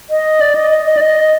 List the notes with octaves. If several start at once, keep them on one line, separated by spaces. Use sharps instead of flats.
D#5
D5
D#5
D#5
D#5
D5
D#5